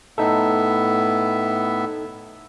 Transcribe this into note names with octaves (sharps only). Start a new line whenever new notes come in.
A2 B3 D#4 A4 E5